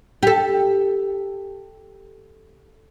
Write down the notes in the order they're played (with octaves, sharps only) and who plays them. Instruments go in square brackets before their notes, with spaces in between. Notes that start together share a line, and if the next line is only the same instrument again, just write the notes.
[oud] G4 A4